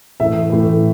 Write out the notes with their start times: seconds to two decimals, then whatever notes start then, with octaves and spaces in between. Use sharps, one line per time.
0.20 A2 E3 A3 E5
0.50 A2 E3 A3